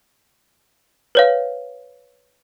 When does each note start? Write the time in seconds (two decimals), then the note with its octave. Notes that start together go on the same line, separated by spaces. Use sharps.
1.15 B4 C#5 F5